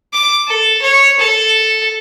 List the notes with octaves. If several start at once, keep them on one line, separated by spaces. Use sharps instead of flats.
D6
A4
C#5
A4